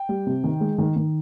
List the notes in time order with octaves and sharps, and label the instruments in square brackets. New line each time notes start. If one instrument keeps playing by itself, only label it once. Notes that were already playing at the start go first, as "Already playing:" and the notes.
Already playing: [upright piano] G5
G3
C3
D#3
G#3
D#3
D#3